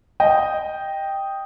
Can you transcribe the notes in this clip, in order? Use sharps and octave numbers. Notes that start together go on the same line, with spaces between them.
D#5 G5